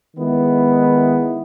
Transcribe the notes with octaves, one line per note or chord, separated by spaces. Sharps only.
D#3 G#3 B3 E4